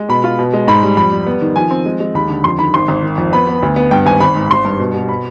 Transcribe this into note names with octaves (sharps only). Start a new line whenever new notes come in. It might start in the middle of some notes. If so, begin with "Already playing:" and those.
Already playing: G#3
B2 B5
F4
B2
G#3
G#2 B5
G3
F2 B5
G3
B3
D#3
F3 G#5
C4
G#3
G#3
D#2 B5
D3
F2 C6
D#3 B5
G#1 C6
G#1
D#3
F2
B3 B5
B3
D2
B3
G2 G5
G#1 G#5
G#1 B5
G#2
G#1 C6
G2
B2
B2
B5